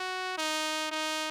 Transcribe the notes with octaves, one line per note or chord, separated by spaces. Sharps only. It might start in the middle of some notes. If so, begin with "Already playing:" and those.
Already playing: F#4
D#4
D#4